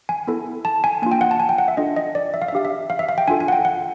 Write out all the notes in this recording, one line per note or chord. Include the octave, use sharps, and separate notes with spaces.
G#5
B3 E4 A4
A5
G#5
A#3 D4 F4 G#5
G5
F#5
A5
G#5
G5
F#5
E5
D4 F4 A4 D#5
D#5
D5
E5
F5
E5
D4 G4 F5
E5
F5
E5
F5
G5
D4 F4 A4 G#5
G#5
F#5
G5
F#5